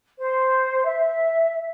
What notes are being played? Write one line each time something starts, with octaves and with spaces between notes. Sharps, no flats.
C5
E5